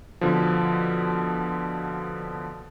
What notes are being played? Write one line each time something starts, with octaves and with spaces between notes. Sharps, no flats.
B2 D3 F3